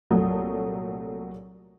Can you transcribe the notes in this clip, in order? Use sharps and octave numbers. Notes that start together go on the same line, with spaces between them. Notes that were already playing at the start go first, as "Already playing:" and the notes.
C2 A#2 F#3 A3 C#5 D#6